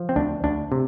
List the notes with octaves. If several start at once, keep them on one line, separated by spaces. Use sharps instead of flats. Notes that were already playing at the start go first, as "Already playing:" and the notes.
Already playing: F3
C4
D2 D4
D2 D4
C3